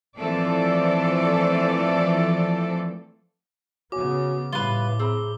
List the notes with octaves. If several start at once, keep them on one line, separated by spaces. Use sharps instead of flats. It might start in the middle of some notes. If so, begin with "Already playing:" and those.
E3 F3 A3 C4 A4 D5
C#3 B3 F#4 C#5 G#5 D6
A2 G3 F4 G4 B4 G7
C4 G#4 A#5 B5